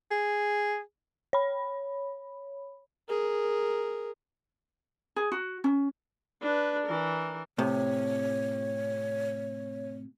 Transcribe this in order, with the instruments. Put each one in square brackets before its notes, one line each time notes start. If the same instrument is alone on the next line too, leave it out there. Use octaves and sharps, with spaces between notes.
[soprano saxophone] G#4
[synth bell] C#5 B5
[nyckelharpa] G#4 A#4
[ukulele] G#4
F#4
C#4
[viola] D4 B4
E3 A#4
[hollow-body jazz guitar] A2 C3 [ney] C#5